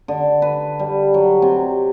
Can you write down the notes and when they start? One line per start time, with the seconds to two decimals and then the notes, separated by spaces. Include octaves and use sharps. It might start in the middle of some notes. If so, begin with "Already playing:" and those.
0.08 D3
0.42 B4
0.79 G3
1.14 F#3
1.42 C3